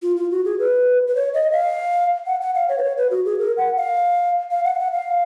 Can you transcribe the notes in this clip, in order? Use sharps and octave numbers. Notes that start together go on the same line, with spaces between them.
F4
F4
F#4
G#4
B4
B4
C#5
D#5
F5
F#5
F#5
F5
C#5
B4
C#5
B4
F#4
G#4
A#4
F#5
F5
F5
F#5
F5
F#5
F5